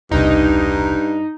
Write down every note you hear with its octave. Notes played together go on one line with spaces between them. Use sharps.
E1 C2 G2 C3 D#4